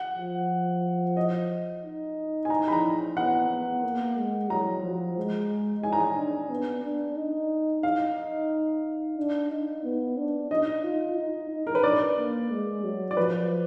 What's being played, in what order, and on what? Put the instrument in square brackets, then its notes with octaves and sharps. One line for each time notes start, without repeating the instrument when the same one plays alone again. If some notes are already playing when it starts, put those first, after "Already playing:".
Already playing: [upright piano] F#5
[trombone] F3
[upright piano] D#5
[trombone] D#4
[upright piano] G#5
A#5
B5
A#5
[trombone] B3 [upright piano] F#5
[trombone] B3
A#3
G#3
[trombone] F#3 [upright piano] A#5
[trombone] F3
G#3
[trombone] D#4 [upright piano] G#5
[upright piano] A#5
G#5
[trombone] D4
B3
D4
D#4
[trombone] D#4 [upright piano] F5
[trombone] D4
D#4
B3
D4
[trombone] D#4 [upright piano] D#5
[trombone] F4
D#4
D#4
[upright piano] A#4
B4
[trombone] D4 [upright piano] D5
[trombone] A#3
G#3
F#3
[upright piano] D5
[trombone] F3 [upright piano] B4